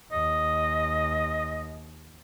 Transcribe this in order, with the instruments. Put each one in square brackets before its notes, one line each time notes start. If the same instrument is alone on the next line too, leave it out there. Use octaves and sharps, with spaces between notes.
[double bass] D#2 [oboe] D#5